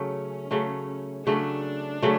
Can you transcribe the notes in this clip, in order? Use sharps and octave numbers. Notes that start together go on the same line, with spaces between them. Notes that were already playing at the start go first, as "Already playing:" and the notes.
Already playing: C#3 F#3 A3 C#4
C#3 F#3 A3
C#3 F#3 A3 D4
C#3 F#3 A3